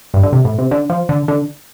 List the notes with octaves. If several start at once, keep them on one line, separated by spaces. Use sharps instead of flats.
G2
D3
C3
A2
C3
D3
F3
D3
D3